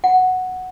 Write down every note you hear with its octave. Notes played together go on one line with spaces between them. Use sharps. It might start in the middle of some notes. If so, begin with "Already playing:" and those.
F#5